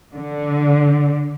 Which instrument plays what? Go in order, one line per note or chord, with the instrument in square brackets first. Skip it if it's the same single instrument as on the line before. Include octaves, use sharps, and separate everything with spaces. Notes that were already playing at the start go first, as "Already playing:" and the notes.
[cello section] D3